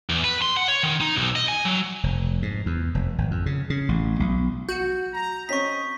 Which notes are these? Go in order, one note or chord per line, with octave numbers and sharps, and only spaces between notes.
E2
B4
C6
F#5
C#5
D#3
D#4
B1
D#5
G#5
F#3
F1
G#2
E2
F1
G#1
F2
C#3
C#3
A1
B1
F#4 G6
A#5
C4 C#4 C#5 D#5 C#6 B6